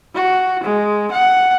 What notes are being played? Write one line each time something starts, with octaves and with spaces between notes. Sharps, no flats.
F#4
G#3
F#5